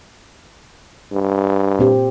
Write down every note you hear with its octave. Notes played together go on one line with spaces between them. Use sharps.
G2
A#2 C4 G4